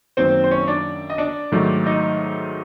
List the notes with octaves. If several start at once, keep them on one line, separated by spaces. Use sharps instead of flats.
F#2 D#3 F#3 A#3 C4 D#4 C5
C5
C#4 C#5
D4 D5
D#5
D4 D5
G#2 D#3 F#3 A3
D#4 D#5